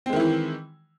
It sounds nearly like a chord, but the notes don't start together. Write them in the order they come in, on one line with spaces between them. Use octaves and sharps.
C4 G#3 D#3 E4 E3